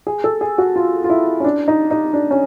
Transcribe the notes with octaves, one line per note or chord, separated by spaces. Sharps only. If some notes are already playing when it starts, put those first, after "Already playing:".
G#4
A4
G#4
F#4
F4
F4
E4
C#4
D4
D#4
D#4
D4
C#4